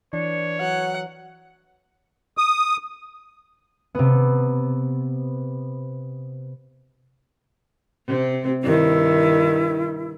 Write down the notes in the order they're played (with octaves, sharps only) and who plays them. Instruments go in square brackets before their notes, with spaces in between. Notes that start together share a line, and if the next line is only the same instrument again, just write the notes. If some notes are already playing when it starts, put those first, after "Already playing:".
[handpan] E3 [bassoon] D4 [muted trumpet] C#5
[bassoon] F#3 [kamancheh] F#5
[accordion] D#6
[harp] C3 B3
[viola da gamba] C3 C4
[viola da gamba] G2 D#3 [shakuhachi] E4